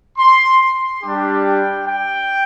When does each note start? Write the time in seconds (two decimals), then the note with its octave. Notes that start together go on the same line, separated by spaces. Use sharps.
0.17 C6
1.01 G3 D4 G4
1.44 G5
1.87 G5